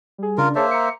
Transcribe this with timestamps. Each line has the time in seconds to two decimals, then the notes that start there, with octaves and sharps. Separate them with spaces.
0.18 G3 G#4
0.38 C#3 D4 F4 A#4
0.55 A#3 G#4 C5 C#5 E5 A5
0.71 A#5 C#7